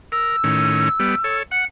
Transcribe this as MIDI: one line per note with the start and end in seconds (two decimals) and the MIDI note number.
0.12 0.36 70
0.12 1.39 88
0.44 0.89 45
0.44 0.89 51
0.44 0.89 61
0.99 1.15 55
0.99 1.15 59
1.24 1.43 69
1.24 1.43 73
1.52 1.65 78
1.52 1.66 97